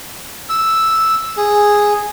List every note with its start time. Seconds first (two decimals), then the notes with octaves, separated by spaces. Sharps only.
0.49 E6
1.37 G#4